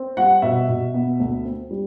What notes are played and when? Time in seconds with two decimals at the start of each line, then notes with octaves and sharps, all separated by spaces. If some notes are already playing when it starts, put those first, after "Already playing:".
Already playing: C4
0.17 G3 F#5
0.42 B2 E5
0.68 B2
0.94 B3
1.20 D2
1.45 C4
1.71 G3